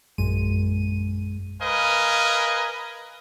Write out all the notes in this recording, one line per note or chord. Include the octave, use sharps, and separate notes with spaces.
A#1 F#2 G#3 D#7
A#4 B4 D#5 F5 G#5